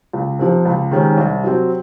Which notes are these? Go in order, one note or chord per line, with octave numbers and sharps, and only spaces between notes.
C#2
C3 F3
C#2
C3 D#3 G#3 C#4
C2
C3 F#3 C4